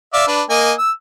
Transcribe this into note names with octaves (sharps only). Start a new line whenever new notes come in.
D5 E5 F5
D4 B4
A#3 D#5 G#5
E6